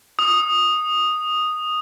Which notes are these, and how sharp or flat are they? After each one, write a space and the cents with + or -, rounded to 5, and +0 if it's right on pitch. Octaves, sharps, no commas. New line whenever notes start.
D#6 -5